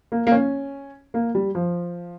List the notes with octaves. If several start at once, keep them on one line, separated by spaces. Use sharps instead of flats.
A#3
A#3
C#4
A#3
G3
F3